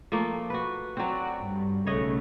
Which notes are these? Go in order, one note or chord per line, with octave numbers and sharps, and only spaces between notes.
F3 A3 A#3
F#4 B4
F#3 C4 F#4 D5
G2
B1 C#3 A3 C#5 D#5 F#5